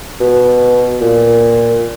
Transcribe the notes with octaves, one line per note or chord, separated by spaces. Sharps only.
B2
A#2